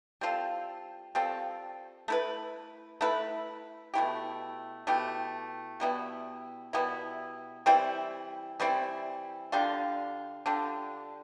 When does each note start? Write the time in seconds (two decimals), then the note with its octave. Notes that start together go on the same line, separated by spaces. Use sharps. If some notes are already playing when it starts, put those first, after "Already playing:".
0.21 G3 C4 F4 A4
1.15 G3 C4 F4 A4
2.08 A3 E4 B4
3.01 A3 E4 B4
3.94 B2 A3 E4 G4
4.87 B2 A3 E4 G4
5.80 B2 G3 B3 E4
6.73 B2 G3 B3 E4
7.66 E3 G3 C4 E4
8.60 E3 G3 C4 E4
9.52 D3 G3 D4 F4
10.46 D3 G3 D4 F4